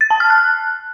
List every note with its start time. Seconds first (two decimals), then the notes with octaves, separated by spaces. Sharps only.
0.01 A6
0.10 A5
0.20 F6
0.30 F#6